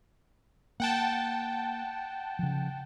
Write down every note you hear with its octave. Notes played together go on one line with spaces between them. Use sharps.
A#3 F#5 G5 A5
C#3 F3